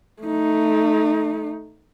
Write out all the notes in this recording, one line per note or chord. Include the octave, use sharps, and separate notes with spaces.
A3 D#4